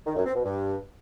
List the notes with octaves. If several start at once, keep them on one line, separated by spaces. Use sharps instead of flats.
D#3
F#2
C4
B2
G2